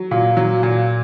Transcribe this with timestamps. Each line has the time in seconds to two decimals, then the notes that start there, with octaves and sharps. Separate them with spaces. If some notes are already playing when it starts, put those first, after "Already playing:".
Already playing: F#3
0.11 A#2
0.37 F#3
0.63 A#2